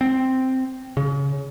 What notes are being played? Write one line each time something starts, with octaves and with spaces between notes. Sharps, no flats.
C4
C#3